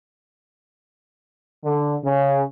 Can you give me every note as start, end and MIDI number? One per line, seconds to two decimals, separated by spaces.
1.64 1.95 50
2.05 2.42 49